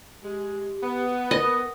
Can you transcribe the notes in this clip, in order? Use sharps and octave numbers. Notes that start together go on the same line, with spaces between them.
G#3 G4
B3
A#4 D#5